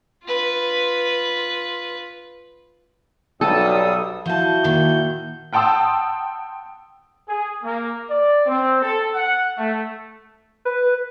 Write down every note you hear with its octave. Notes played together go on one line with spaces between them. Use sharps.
F4 B4
B1 G3 A4 D#6 E6
F3 E4 F#4 A5 G6
A#2 D#3
F#5 G5 A5 C6 D#6 E6
G#4
A#3
D5
C4
A4
F#5
A3
B4